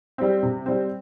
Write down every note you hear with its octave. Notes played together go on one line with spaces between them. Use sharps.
G3 C4
C3
G3 C4